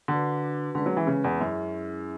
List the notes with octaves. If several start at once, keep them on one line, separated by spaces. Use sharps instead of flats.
D3 D4 F#4 B4
D3 G#3 C#4 G#4 B4
F#3
E3
C#3
E2
F#2 C#4 E4 G#4